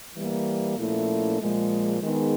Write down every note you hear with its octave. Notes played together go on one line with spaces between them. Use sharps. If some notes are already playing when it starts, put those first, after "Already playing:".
E3 G3 A#3
A#2 F3 A3 C#4 E4
A#2 F3 G#3
D#3 G#3 B3 D#4 G#4